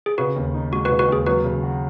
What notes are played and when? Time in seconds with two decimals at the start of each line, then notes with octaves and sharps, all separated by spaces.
0.06 G#4
0.18 C#3 F#4 B4
0.36 D#2
0.54 D#4
0.72 G#3 F#4
0.85 F#4 B4
0.90 C#3
0.99 F#4 B4
1.09 D#2 G#4
1.26 F#3 F#4 B4
1.44 C#3
1.63 F#4